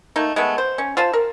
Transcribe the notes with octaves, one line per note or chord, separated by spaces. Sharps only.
A3 A#3 D#4
G#3 A3 B3
C5
C#4
F4 C5 F5 A5
A#4